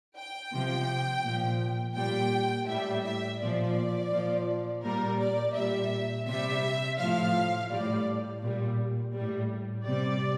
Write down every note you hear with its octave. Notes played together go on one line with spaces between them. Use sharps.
G5
C3 F3
A#2 F3
A#2 G3 G5
A2 G3 E5
E5
A#2 F3 D5
A#2 F3
A#2 G3 A#4
D5
A#2 G3 E5
C3 G3 E5
A2 F3 F5
A2 G3 D5
A#2 G3
A2 G3
C3 G3 D5